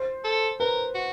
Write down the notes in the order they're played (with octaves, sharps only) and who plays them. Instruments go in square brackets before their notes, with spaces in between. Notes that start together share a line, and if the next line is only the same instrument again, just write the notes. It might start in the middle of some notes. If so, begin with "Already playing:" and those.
Already playing: [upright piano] C5
[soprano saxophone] A4
[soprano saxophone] A#4 [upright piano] B4
[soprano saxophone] F#4